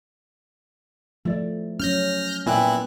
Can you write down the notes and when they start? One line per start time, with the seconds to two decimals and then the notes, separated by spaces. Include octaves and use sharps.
1.25 F3 A3 E4 D5
1.80 F#3 C#4 F6 G6 A#6
2.46 A#2 B3 E4 G5 G#5 F#6